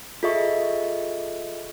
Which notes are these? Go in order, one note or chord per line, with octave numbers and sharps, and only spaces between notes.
F4 G#4 A4 D#5 E5 C#6